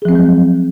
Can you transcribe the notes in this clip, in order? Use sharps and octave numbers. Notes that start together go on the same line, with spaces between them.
F3 F#3 G#3 C4 G#4